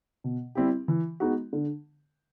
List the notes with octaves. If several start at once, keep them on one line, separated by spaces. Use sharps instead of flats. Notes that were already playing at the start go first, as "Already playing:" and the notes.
B2
G3 C4 E4 G4
E3
G#3 B3 D#4 F#4
D3